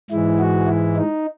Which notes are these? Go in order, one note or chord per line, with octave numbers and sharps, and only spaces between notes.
G#2 E3 G#3 E4
F#4
E4
D#4